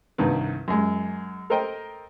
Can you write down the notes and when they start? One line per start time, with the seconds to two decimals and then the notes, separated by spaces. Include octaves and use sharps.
0.18 C2 G2 D#3 B4
0.68 F#2 G#3
1.50 A4 A#4 C5 D#5 G5